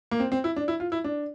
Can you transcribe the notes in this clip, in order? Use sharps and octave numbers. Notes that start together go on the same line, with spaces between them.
A#3
C4
C4
E4
D4
E4
F4
E4
D4